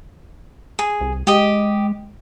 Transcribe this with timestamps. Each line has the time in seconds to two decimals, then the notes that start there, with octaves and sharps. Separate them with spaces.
0.79 G#4
1.01 C2
1.27 G#3 G4 D#5